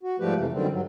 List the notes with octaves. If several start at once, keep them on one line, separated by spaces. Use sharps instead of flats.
F#4
G#2 F3 G3 A3 G4 B4
F2 C3 E3
F#2 D3 D#3 G3 C4
G2 F#3